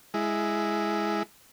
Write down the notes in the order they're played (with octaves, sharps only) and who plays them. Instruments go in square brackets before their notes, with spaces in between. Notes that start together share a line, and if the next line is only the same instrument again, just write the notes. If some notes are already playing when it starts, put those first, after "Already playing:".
[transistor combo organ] G#3 E4